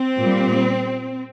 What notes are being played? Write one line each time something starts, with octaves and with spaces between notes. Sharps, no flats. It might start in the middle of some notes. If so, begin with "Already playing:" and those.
Already playing: C4
A#2 G3